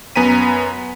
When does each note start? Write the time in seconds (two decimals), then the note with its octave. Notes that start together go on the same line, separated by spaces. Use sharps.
0.16 F#2 B3 G#5 A#5 B6 D#7